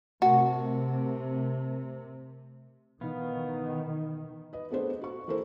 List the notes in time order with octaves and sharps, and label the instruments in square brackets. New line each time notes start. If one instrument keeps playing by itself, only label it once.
[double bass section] C3 [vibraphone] A3 A#4 [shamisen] F#4
[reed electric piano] B2 E3 D#4 [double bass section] D#3 [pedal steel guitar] B3 F5
[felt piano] B4 D#5
A3 B3 D4 G#4 C5
F#4 C#6
E3 A#3 A4 A#4 C5